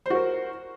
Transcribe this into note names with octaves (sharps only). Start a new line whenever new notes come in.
F#4 A#4 C5